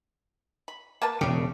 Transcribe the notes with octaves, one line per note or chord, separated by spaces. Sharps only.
B5
A#3 B4 A5
E1 C#3 G4